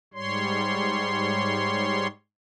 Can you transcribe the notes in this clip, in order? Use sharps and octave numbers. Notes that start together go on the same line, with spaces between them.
G#2 G3 C#5 C6